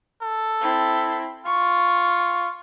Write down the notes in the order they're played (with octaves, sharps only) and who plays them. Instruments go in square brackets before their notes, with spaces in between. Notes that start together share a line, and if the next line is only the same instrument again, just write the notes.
[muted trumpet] A4
[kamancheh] C4 E4
[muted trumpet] F4 [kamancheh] C#6